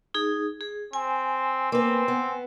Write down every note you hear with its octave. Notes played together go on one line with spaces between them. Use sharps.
D#4 G#4
G#4
C4 G#5
A#3 C4 B4
B3